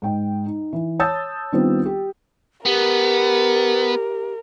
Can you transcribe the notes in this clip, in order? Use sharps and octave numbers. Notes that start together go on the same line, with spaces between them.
G#2 G5
D#4
E3
C#5 A5 D#6 E6 G6 A6
D#3 G3 B3 C4 D4 F4
G4
B3 G4 A#4